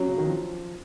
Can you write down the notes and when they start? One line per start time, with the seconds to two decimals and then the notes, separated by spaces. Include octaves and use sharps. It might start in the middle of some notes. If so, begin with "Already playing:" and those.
Already playing: F#3 C#4 F#4 C#5
0.08 C#3
0.18 D#3
0.26 F3